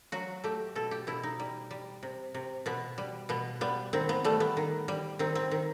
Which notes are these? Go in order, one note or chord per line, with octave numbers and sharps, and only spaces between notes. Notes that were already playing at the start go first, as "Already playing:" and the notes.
F#3 F#4
A3 G4
B2 A4
G4
B2 E4
D#4
G3
G3
C3
C3
B2 B3
G3
B2 B3
G3 B3
D#3 C4
B3
G3 A3
B3
D#3
G3
D#3 C4
C4
D#3